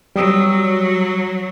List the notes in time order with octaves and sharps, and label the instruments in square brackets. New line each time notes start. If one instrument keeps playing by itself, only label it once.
[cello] F#3 [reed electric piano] G3 D#6 E6